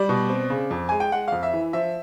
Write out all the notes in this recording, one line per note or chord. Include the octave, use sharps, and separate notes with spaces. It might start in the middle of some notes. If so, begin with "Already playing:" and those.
Already playing: G3 D5
B2
C4
C#3
F2
G#3 G#5
G5
G#3 F#5
F2 F5
E5
E3
F3 E5